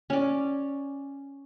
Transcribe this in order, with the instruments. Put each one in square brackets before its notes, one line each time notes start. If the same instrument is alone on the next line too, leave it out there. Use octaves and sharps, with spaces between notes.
[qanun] C#4 D5